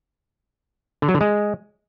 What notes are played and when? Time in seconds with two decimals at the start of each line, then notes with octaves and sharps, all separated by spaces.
1.02 D3
1.08 F#3
1.15 D3
1.21 G#3